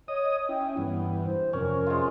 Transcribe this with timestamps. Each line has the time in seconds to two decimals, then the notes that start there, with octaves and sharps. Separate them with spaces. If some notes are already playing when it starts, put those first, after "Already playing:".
0.08 C#5 D#5 D#6
0.49 C#4 E4 G5
0.77 G2 E3 B3
1.25 C5
1.53 F2 C3 C#4 A#4
1.87 G#3 F4